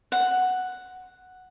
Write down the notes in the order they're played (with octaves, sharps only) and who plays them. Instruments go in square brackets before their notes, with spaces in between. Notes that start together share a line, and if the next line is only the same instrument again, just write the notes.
[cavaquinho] F#5